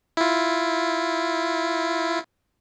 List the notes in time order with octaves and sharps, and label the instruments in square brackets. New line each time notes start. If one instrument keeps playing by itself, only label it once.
[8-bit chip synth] E4 F4